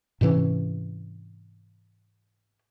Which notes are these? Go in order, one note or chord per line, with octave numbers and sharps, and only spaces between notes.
G#2 C3 E3 C#4